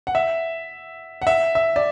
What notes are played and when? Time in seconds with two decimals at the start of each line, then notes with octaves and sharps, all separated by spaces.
0.07 F#5
0.15 E5
1.22 F#5
1.27 E5
1.55 E5
1.76 D5